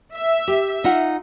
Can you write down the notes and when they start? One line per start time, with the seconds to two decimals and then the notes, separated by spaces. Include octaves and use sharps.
0.15 E5
0.47 G4
0.84 D#4 F4 F#5